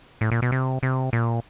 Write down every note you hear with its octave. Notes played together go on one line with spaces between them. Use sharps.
A2
A#2
B2
C3
C3
A#2